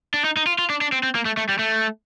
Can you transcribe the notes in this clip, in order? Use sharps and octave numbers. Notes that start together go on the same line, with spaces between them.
D4
D#4
D#4
F4
F4
D4
D4
C4
C4
A#3
A3
A3
G3
A3